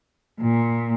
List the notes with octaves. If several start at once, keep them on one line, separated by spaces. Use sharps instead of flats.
A#2